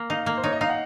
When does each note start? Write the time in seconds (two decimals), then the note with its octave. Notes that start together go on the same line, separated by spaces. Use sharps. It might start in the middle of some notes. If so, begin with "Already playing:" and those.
Already playing: A#3
0.10 D#4 F5
0.26 A#3
0.37 C5
0.44 D#4 C#5
0.53 D#5
0.61 D#4 F5
0.69 F#5